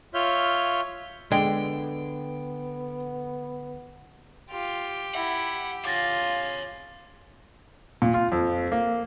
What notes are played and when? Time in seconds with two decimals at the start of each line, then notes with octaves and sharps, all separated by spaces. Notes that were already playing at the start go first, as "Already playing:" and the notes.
0.14 F4 C#5 E5 F6 G6
1.32 D3 G#3 B3 G5
4.51 F4 G4
5.15 E4 E5 F#5
5.85 F4 C#5 F5 D6 A6 A#6
8.02 A#2
8.14 F4
8.32 F2
8.72 A#3